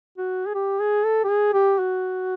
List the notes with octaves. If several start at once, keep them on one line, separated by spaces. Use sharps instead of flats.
F#4
G#4
G4
G#4
A4
G4
G#4
G4
F#4